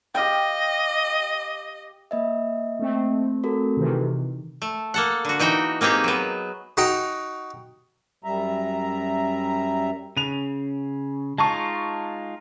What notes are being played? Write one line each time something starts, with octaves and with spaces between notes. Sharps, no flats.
G4 D#5 F5 G5
A#3 D#5 E5
A3 C4
F#4 A4 A#4
C3 D#3 E3
A3
A#3 A4 F#5
D3 F#4
E3 D#4 F#4 G5
A#3 C4 D#4 G4 G#4
F#3 B3
D#4 F#4 D#5 G5 A#5
F#2 G3 E5 A#5
C#3 D#7 F7
G#3 D#4 F4 A5 C#6